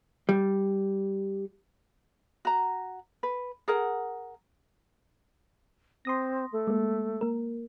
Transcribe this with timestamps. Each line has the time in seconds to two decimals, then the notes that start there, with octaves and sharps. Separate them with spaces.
0.29 G3
2.45 F#4 A#5
3.23 B4
3.68 G#4 A#4 F#5
6.05 C4 C6 D#6 A#6
6.52 A3
6.67 G#3 A#3
7.21 A#3 A#4